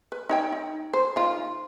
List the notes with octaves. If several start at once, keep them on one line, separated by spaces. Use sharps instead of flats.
B4
D#4 C#5 G5
D#4
C5
D#3 F4